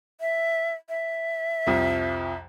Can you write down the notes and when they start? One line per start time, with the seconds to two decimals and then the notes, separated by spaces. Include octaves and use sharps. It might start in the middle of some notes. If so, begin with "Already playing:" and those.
0.21 E5
0.89 E5
1.67 C2 F2 F3